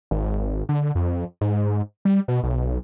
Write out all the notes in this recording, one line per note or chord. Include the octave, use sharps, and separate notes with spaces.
G#1
D3
F2
G#2
G3
B2
B1